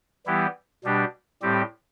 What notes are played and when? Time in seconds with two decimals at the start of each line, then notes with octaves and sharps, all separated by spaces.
0.26 E3 G3 B3 E4 G4
0.84 B2 G3 D4 G4
1.42 A2 G3 C4 G4